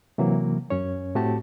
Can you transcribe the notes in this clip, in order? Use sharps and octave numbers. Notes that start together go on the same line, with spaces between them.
C3 E3 F#3 A#3
F#2 C#4 C#5
A2 A3 C4 F#4 G4 A5